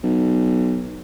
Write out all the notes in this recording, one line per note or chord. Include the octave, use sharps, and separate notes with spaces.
B1